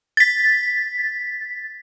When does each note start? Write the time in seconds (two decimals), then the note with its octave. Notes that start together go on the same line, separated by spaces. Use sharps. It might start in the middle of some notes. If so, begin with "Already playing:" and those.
0.17 A6 B6